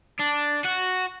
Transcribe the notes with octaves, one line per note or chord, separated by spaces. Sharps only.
D4
F#4